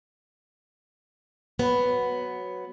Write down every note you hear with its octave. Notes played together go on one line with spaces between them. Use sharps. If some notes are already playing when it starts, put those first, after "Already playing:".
F#3 B3